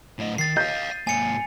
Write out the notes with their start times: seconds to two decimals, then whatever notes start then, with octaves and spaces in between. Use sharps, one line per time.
0.19 A2 D#5
0.38 D#3 A6 C7
0.57 D#5 F5 G6
1.07 G#2 A#3 G#5 C#7